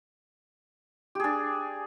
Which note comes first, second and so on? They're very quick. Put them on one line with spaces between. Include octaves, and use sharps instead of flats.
G4 G#4 D4